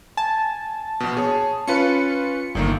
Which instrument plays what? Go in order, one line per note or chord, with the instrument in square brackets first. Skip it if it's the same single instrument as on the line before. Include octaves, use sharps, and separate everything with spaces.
[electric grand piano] G#5 [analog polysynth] A5
[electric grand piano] A#1 B2
G#4 C#5
[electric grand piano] C#4 F4 B4 [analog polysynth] C#7
[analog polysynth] G1 [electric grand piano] C2 D#3 A#3